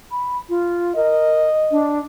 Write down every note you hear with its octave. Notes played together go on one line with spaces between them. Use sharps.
B5
F4
A#4 D#5
D4